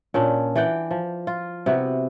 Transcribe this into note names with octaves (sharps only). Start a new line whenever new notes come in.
A#2 C#4 D4
E3 D5 F#5 G5
F3
F4
C3 B3 E4 F#4